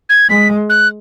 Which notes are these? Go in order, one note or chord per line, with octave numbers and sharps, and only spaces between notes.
G#6
G#3 B6
F#6